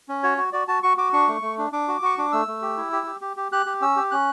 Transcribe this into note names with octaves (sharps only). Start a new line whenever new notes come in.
C#4
F#4 C#5
F#4
F#4 D5
F#4 A5
F#4 C#6
F#4 D6
D4 C#6
A3
A3
D4
D4 D6
F#4
F#4 C#6
D4 D6
A3 E6
A3
G4
E4
G4
G4
G4
G4
G4 F#6
G4
C#4 E6
G4
C#4 F#6